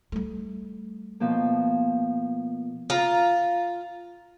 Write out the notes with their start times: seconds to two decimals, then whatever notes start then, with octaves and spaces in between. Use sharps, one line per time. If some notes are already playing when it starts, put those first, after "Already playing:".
0.12 G3 A3
1.20 B2 F3 A#3
2.90 F4 A#5